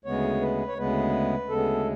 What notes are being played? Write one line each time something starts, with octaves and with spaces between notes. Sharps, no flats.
D2 C#3 G#3 B3 C#5
B4
C#5
D2 C#3 G#3 B3 B4
D2 C#3 G#3 B3 A4